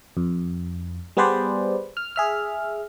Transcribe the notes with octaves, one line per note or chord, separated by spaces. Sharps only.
F2
G3 B3 G#4 B4 C5 D5
F6
G#4 E5 F6